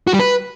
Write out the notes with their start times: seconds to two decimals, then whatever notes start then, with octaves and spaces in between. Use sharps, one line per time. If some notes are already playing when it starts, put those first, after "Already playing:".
0.07 F#4
0.13 G3
0.20 B4